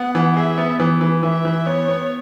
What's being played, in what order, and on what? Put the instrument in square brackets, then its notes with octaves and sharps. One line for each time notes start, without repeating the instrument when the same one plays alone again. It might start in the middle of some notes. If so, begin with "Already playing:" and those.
Already playing: [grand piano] B3 [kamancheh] F#5
[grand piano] E3
[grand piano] G#4 [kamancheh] E5
[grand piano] B3
[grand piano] E3 [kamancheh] B4
[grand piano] E3
[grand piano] E3 [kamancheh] E5
[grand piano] E3
[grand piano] B3 [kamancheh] C#5
[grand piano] B3